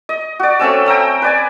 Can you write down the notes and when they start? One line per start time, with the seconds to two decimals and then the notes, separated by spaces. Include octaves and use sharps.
0.09 D#5
0.40 F#4 D5
0.59 A3 C4 C#4 E6
0.86 G5 A#5 D#6 E6
1.22 B4 D5 G#5